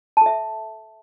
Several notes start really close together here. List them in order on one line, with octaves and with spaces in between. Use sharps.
A5 A4 E5